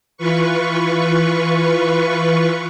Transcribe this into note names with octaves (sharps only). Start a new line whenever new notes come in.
E3 F4 B4 C#6